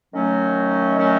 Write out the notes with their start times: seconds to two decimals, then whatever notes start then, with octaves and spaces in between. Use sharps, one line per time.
0.13 D#3 F#3 A3 C#4
0.96 D#3 F#3 A3 C#4